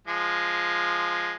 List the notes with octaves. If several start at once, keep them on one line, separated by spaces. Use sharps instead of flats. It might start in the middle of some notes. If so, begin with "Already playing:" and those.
F3 G#3